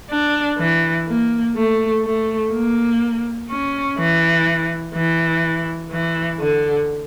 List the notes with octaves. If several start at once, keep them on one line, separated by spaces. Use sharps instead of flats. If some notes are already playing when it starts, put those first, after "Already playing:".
D4
E3
A#3
A3
A3
A#3
C#4
E3
E3
E3
D3